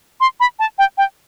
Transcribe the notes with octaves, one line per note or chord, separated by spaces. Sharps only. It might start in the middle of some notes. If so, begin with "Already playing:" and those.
C6
B5
A5
G5
G5